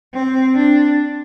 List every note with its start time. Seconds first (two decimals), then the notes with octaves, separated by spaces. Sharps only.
0.14 C4
0.55 D4